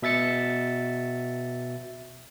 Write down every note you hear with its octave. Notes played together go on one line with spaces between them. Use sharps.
B2 E5 A6 C#7